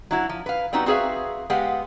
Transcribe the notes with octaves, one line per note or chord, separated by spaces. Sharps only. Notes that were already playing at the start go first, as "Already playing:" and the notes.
F#3 E4 F#4
F3
B4 F5
G3 B3 C4 D#4 F#4
C4 F#4 G#4 B4 E5 F5
G#3 B3 G4 F5 F#5